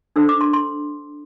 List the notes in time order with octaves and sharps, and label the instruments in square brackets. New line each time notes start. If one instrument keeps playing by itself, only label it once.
[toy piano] D4 A4 C5 E6
D6
C6
C6